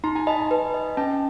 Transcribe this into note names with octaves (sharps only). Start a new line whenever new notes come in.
D#4 A#5 C6
G#5 A#5
D#5 A5 B5
G#5 A#5
B4
D#5
C#4 G5 A5